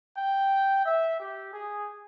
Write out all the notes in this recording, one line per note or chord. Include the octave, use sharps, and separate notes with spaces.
G5
E5
G4
G#4